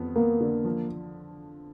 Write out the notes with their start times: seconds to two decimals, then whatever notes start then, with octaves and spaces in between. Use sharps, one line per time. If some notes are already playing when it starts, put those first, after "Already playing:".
Already playing: F2 B3
0.16 A#3 B3
0.40 D3
0.65 F3